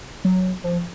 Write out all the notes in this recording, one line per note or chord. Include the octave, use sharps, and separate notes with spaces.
F#3
F3